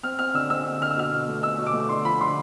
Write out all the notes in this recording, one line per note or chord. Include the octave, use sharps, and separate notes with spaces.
C4 F6
C4 F6
D3 E6
C4 E6
D3
D3 F6
E6
B2 F6
B2
A3
B2 E6
B2
D6
A3
D3 C6
F3 B5
D3 C6